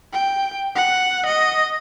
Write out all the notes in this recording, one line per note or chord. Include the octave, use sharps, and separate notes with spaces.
G5
F#5
D#5